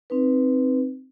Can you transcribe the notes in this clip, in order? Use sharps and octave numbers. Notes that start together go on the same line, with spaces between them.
C4 D#4 B4